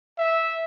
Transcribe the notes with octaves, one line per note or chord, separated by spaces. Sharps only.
E5